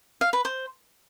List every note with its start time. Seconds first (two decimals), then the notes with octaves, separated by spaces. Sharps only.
0.21 F5
0.33 B4
0.45 C5